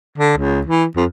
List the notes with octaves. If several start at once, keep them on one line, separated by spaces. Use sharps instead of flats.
D3
C#2
E3
F2